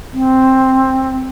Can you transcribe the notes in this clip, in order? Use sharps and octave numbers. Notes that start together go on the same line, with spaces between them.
C4